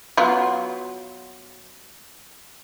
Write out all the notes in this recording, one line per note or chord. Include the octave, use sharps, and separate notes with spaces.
F#3 B3 F4